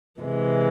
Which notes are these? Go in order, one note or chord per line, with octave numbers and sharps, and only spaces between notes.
C3 E3 G#3